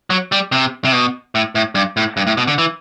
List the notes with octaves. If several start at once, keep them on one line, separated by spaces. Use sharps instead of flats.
F#3
G3
C3
C3
B2
A2
A2
G2
A2
G2
A2
B2
D3
E3